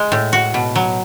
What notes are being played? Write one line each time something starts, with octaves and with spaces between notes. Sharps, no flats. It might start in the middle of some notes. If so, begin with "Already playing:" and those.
Already playing: G#3
A2
F#4
B2
F#3